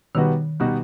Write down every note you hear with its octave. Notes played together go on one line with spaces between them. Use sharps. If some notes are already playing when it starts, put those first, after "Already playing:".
B2 D#3 G3 B3 D#4 F#4
B2 G3 B3 D#4 F#4